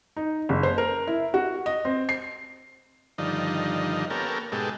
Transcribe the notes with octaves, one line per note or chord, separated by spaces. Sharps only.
D#4
F#1
C5
A#4
E4
F#4
D#5
C4
C7
G2 D3 D#3 F3 D#4
A#3 B3 C#4 G4 A4 A#4
G#2 B2 G#3 G4 A4